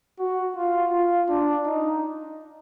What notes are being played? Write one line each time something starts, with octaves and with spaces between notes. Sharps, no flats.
F#4
F4
F4
D4
D#4